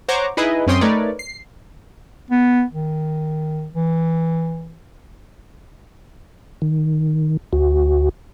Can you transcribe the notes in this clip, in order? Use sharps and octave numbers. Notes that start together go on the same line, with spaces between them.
C5 C#5 F#5 A#5 C#6 D6
D#4 E4 G#4 B4 D#5
F#2 C4 C#4 G5 C6 D#6
A3 D#4 A#4 B4 C#5 D5
C7
B3
D#3
E3
D#3
D2 F#4